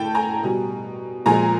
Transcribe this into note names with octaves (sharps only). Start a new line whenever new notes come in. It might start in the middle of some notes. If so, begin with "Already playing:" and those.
Already playing: A2 G5 A5
G#5 A#5
B2 G3
A#2 F3 G#3 G#5 A#5